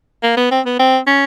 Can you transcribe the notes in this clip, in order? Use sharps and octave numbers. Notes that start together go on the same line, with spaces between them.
A#3
B3
C4
B3
C4
C#4